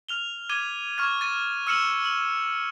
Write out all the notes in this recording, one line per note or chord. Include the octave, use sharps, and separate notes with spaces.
F6 F7 G7
D6 G#6 D#7 G7
C#6 F6 G#6
A6 D#7
E6 F6 C#7 D#7 E7 F#7
F#7